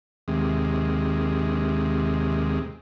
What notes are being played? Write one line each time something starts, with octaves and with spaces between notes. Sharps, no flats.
D#2 C3 G#3